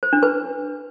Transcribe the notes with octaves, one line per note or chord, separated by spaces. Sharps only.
C5
D4
B4